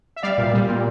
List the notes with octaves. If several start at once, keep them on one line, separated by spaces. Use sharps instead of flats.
E5
G3 D5 F5
A#2
G3
A#2